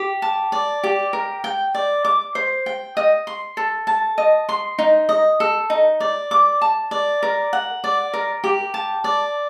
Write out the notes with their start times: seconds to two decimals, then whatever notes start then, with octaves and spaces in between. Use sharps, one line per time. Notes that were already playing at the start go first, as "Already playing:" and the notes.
Already playing: G4
0.22 A5
0.52 D5
0.84 G4
1.13 A#4
1.44 G5
1.75 D5
2.05 D6
2.35 C5
2.66 G5
2.97 D#5
3.27 C6
3.57 A4
3.87 A5
4.18 D#5
4.49 C6
4.79 D#4
5.09 D#5
5.40 A4
5.70 D#4
6.00 D5
6.31 D6
6.61 A5
6.91 D5
7.23 A#4
7.53 F#5
7.84 D5
8.14 A#4
8.44 G4
8.74 A5
9.04 D5